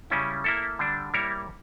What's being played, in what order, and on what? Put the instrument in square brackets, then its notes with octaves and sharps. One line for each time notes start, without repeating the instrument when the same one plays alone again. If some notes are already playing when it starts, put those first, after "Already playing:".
[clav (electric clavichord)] C#3 G3 C#4 E4
A#3 E4 A4
D3 G3 D4
G3 A#3 E4 A#4 C#5